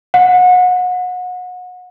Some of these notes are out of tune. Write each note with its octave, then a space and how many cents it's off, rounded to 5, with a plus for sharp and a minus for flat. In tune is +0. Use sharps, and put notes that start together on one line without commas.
F#5 -30